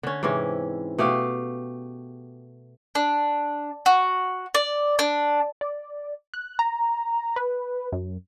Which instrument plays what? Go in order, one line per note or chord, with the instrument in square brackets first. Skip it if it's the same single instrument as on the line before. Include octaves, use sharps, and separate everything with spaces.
[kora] D3 C#4
G#2 C3 E3 C#4
B2 A3 G4 F5
[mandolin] D4
F#4
D5
D4
[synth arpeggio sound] D5
F#6
A#5
B4
F#2